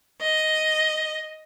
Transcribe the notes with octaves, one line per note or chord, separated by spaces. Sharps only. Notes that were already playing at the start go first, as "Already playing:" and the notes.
D#5